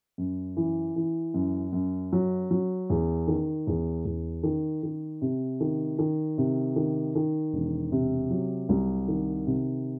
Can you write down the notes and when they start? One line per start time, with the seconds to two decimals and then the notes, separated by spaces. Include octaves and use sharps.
0.18 F#2
0.57 E3
0.96 E3
1.34 F#2
1.73 F#2
2.12 F#3
2.51 F#3
2.90 E2
3.27 D#3
3.67 E2
4.05 E2
4.43 D#3
4.83 D#3
5.22 C3
5.60 D#3
5.99 D#3
6.38 C3
6.76 D#3
7.15 D#3
7.53 E1
7.92 C3
8.31 F#3
8.69 C2
9.08 D#3
9.47 C3